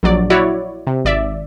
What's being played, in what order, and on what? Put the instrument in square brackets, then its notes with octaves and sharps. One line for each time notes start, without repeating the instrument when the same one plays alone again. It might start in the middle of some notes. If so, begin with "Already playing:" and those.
[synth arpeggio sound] A#1 F#3 D5
E4 F#4 C#5 D5
C3
G#1 D5 E5